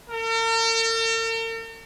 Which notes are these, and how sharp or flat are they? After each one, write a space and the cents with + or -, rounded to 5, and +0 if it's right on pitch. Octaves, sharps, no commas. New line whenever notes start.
A#4 -45